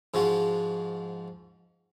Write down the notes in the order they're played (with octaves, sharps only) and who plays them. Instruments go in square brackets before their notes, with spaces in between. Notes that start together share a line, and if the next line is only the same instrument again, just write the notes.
[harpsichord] G#2 F3 G#3 F#4